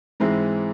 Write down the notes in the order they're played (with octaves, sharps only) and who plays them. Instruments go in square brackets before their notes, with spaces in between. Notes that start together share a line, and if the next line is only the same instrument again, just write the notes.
[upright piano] G#2 E3 G#3 C4 E4